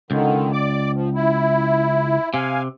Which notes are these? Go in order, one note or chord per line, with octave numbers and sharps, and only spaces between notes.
C#2 D3 D#3
D5 D6
F3
E4
C3 F5 G#5